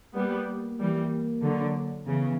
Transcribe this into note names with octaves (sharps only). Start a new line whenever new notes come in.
G3 A#3 B3
A#3
E3 G3
D3 F#3
C#3 E3 B3